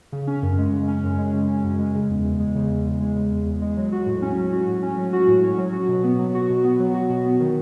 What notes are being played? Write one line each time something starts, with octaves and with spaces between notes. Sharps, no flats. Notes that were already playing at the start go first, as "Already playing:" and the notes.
C#3
C#4
F#2
G#3
C#3
C#4
F#2
G#3
C#3
C#4
F#2
G#3
C#3
E2
E2
G#3
C#3
E2
E2
G#3
C#3
E2
E2
G#3
F#3
F#4
A2
C#4
F#3
F#4
A2
C#4
F#3
F#4
A2
C#4
F#3
F#4
B2
B3
F#3
F#4
B2
B3
F#3
F#4
B2
B3
D#3